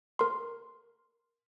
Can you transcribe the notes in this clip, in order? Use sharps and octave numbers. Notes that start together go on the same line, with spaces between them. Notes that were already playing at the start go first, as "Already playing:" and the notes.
A#4 C6